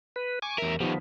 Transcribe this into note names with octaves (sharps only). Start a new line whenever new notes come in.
B4
G#5 C#6 D6
E2 A#4 E5 A#5
D#3 F3 G3 B3